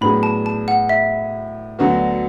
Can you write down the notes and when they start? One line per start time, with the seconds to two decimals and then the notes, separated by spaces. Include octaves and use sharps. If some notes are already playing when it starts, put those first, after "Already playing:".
0.01 A2 F#3 B3 D4 G#4 B5
0.23 A5
0.46 A5
0.68 F#5
0.89 E5
1.79 D2 D3 F#3 B3 F#4